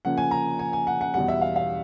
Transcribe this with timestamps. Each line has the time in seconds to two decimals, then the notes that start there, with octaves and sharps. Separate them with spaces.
0.05 C#3 F3 A#3 C#4 F#5
0.18 G#5
0.31 A#5
0.59 G#5
0.73 G#5
0.87 F#5
1.01 F#5
1.14 E2 B2 G3 F#5
1.28 E5
1.41 F5
1.56 F5